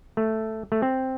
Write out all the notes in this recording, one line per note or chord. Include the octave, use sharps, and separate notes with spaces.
A3
A3
C4